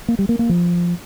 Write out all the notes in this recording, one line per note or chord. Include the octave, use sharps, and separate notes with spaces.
A#3
G3
A#3
A#3
F3